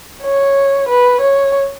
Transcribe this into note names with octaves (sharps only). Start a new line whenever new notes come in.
C#5
B4
C#5